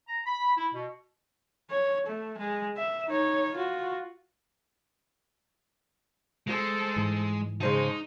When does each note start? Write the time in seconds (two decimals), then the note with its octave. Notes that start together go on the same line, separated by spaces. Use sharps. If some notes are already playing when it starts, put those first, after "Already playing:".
0.07 A#5
0.26 B5
0.57 E4
0.73 B2
1.70 C#5
2.07 A3
2.38 G#3
2.77 E5
3.08 D#4 C#5
3.55 F4 F#4
6.47 G#3 A4 C5
6.96 G#2 E3
7.60 C#3 G#3 D#4 C5 A5